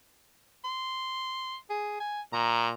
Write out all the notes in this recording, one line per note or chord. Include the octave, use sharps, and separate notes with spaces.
C6
G#4
G#5
A#2 A#5